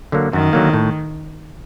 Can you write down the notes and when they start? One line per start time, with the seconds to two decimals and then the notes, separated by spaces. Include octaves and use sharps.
0.12 D3 F#3 A#3
0.33 F#2 D#3
0.53 D3 F#3 A#3
0.73 A2